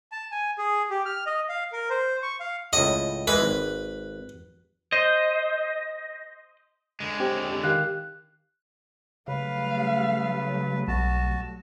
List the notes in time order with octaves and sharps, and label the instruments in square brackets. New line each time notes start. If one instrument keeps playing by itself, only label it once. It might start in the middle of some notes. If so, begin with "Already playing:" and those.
[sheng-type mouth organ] A5
G#5
G#4
G4
F6
D#5
F5
A#4
C5
C#6
F5
[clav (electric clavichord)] C#2 A2 [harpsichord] D#5
[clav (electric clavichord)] E3 G#3 [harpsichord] B4
[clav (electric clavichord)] G#1
[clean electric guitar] C5 [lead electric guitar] D#5
[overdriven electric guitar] D3 G#3
[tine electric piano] C4 G4
[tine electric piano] D#3 G4 F5 [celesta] F#6
[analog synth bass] C#3 [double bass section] F#3 G3 A3 [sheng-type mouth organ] B4 [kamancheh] F5
[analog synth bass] B1 [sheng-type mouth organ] F#4 A5